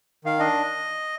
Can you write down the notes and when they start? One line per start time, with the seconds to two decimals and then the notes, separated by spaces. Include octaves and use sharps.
0.25 D#3 F5
0.39 D4 D#5